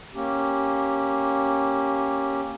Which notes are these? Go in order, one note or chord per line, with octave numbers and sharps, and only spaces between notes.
A#3 C#4 G4